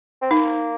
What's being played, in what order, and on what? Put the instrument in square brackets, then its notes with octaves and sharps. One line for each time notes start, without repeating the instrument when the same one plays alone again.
[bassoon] C4
[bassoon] A#3 [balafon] D#4